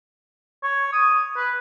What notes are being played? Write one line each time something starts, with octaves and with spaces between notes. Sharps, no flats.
C#5
D#6
B4